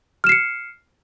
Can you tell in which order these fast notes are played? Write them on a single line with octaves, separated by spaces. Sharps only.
F6 E7 C7 C#7